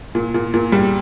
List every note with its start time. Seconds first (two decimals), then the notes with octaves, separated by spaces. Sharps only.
0.15 A#2
0.34 A#2
0.54 A#2
0.72 G3